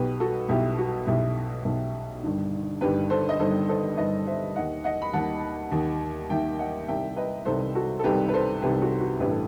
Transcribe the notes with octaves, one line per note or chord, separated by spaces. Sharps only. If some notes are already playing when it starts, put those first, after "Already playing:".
Already playing: B1 B2 G4 B4
F#4 A4
B1 B2 E4 G4
F#4
B1 B2 E4 G4
B1 B2
G1 G2 D#3
G1 G2 D#3 G4 B4
A4 C5
D#5
G1 G2 D#3 A4 C5
A4 C5
G1 G2 D#3 B4 D#5
C5 E5
D#2 D#3 D#5 F#5
D#5 F#5
B5
D#2 D#3 F#5 A5
D#2 D#3
D#2 D#3 E5 G5
D#5 F#5
C2 C3 D#3 E5 G5
B4 D#5
C2 C3 D#3 A4 C5
F#4 A4
A4
C2 C3 D#3 G4 B4
B4
A4 C5
C2 C3 D#3 G4 B4
F#4 A4
F#4
A1 G2 E3 G4 B4
A4